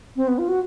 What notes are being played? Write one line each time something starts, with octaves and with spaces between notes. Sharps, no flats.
C4
B3
F4
F#4